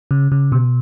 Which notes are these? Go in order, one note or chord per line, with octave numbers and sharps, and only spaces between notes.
C#3
C#3
B2